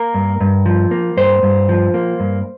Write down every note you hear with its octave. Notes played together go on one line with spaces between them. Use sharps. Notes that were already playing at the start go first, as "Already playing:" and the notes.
Already playing: A#3 A#4
G2
G2
F3
A#3
G2 C5
G2
F3
A#3
G2